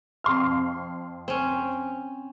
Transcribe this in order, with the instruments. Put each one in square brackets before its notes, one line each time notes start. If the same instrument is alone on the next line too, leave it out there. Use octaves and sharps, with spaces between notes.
[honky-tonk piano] F2 C6 F6
[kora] C4 C#4